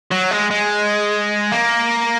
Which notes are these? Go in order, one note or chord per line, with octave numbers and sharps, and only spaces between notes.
F#3
G#3
G#3
A#3